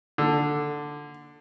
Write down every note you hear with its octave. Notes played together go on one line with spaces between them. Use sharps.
D3